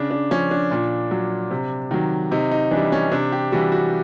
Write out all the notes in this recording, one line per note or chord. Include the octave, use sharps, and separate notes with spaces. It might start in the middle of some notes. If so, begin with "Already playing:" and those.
Already playing: C#3 D4
D4
F3 C#4
D4
A#2
F#3
C3
D#3 F#3
C3 D#4
D#4
E3 D4
G3
C#4
C3 D4
G4
E3 G3 F#4
F#4